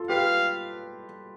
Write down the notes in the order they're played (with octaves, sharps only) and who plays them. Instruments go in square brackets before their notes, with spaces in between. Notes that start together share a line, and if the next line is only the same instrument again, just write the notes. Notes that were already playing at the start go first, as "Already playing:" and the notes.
Already playing: [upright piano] F4 A4
[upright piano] G4 B4 [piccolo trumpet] F5